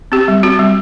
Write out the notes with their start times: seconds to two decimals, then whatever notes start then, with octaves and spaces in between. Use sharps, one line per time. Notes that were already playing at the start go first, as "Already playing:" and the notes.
0.12 C4 G4
0.28 G3
0.43 C4 F#4
0.59 G3